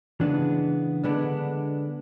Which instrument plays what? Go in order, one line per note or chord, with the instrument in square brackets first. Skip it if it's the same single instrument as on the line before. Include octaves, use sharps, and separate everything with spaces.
[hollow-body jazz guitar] C#3 E3 G#3 B3 D4
D3 G#3 B3 D4